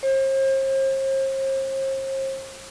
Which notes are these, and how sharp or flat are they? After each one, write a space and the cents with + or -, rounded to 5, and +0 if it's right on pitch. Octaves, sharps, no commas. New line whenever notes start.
C5 +40